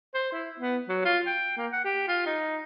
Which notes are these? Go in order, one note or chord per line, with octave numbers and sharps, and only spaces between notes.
C5
E4
B3
F#3
F4
G5
A#3
F#5
G4
F4
D#4